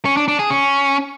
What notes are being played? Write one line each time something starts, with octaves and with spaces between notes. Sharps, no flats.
C#4
D4
D4
G#4
C#4